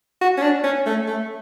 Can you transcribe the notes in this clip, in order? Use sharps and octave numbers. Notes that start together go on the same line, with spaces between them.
F#4
C#4
D4
C#4
A3
A3